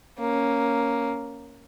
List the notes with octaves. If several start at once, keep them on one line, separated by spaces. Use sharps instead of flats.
A#3 C#4